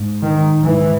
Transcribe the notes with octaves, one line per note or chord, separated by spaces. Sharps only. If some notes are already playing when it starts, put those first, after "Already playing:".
Already playing: G#2
D#3
G#2 E3